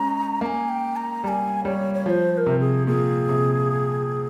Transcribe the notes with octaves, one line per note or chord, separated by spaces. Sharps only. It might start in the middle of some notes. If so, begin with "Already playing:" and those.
Already playing: G#3 C#4 A#5
A#3 G#5 A#5
G5
A#5
G3 G#5 A#5
G3 C#5
C#5
F3 C5 C#5
C5
A#4
C3
G#4
A#2 G#4
C3